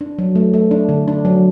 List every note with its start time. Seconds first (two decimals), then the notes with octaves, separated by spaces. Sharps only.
0.01 D4
0.19 F#3
0.35 A3
0.54 A3
0.71 D4
0.89 D3
1.08 D4
1.25 F#3